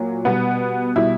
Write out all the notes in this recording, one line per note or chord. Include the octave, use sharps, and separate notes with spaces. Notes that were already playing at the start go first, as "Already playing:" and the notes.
Already playing: A#2 F#3
B2 G3 B3
B2 G3 E4